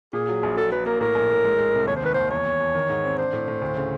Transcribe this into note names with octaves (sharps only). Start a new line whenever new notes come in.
A#2 G#4
F#3
A#1
F#3 A4
F#3 B4
A#3 A#4
A2 A#4
A#1
A2
G#3
G#3
C2
D#2 C#5
C5
D#3 B4
D#2 C5
E2 C#5
E2
E2
D#3
G#2
C4
D4 C5
A2
A2
D2
C#3